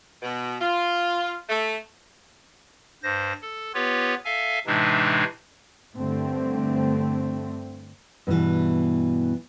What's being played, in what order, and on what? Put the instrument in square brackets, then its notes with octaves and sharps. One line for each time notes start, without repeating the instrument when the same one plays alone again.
[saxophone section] B2
F4
A3
[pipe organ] G2 C5 A#6
A4
B3 F4 G4 B4 C#5
A4 E5 F5 G#5
A2 C3 E3 G#3 D4 D#4
[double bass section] G2 D3 A3 C4
[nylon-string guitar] G2 B2 D#3 E3